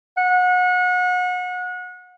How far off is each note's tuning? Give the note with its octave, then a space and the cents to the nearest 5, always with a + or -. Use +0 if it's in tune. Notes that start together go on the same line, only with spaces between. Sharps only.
F#5 -30